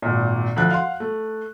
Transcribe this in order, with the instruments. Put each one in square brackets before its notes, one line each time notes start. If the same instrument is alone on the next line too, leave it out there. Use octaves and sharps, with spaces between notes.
[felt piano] G#1 A#2
D2 F3 F#6
F5 F#5 C6
A3